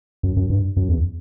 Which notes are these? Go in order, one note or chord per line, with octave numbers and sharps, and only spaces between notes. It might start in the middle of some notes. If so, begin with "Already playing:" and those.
F#2
F#2
G2
F#2
E2